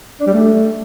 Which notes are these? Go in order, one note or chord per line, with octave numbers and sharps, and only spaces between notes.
D4
G3
A3